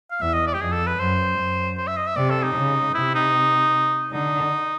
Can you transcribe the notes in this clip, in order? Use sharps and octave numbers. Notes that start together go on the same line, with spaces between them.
F5
E2 E5
D#5
D5
G4
F2 G#4
A4
B4
F#2 C5
F#2
C5
E5
D#5
E5
C3 D5
A4
D#4
C#3
C3 E4
D#4
D3 D#4